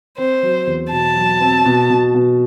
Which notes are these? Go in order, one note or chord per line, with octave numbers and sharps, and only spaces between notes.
C4 C5
F#3
E2
B2 A5
F#3
C4
B2
B2
B2